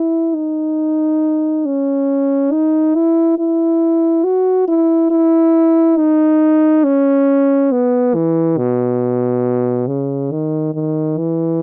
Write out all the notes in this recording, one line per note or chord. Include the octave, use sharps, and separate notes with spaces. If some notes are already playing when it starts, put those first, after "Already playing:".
Already playing: E4
D#4
C#4
D#4
E4
E4
F#4
E4
E4
D#4
C#4
B3
E3
B2
C#3
D#3
D#3
E3